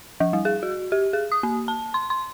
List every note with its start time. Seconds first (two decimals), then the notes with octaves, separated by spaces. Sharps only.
0.20 F3
0.33 G3
0.45 G#4
0.63 F#4
0.92 G4
1.13 G#4
1.32 D#6
1.43 A#3
1.68 A5
1.94 C6
2.10 C6